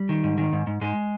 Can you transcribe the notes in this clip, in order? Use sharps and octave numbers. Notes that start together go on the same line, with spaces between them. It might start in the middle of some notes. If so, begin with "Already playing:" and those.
Already playing: G3
D#3
G#2
D#3
G#2
G#2
G#2 G#3